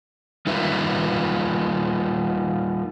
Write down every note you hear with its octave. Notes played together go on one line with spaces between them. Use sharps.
G3 D#4 F4 B4 E5